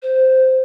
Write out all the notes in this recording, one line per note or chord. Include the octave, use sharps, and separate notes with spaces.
C5